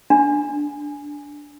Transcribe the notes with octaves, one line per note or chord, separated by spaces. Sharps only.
D4